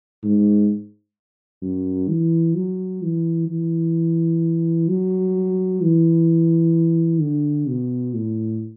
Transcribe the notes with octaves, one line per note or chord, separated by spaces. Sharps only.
G#2
F#2
E3
F#3
E3
E3
F#3
E3
D3
B2
A2